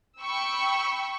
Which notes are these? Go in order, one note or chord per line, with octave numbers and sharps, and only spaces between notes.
G5 B5 C#6 E6